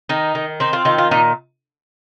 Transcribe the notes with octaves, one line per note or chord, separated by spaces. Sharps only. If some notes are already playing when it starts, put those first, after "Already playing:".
D#3 D#4
D#3
C4 D#4
F4
D#3 F4
F4
A#2 D#4